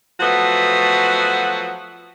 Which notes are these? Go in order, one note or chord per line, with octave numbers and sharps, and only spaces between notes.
F3 F#3 A3 B3 F#4